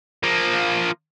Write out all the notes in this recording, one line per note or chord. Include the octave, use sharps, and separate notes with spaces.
F3 A#3